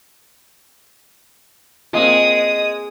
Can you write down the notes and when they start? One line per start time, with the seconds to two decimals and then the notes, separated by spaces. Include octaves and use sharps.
1.93 G#3 A#3 C4 F4 D#5 D#6